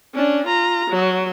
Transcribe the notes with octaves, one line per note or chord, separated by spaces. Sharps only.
C#4 D4
F4 A#5
F#3